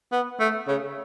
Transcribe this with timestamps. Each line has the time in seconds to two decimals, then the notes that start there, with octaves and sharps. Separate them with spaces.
0.12 B3
0.40 A3
0.68 C#3